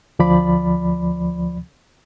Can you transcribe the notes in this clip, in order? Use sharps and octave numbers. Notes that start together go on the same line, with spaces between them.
D2 F3 D5 B5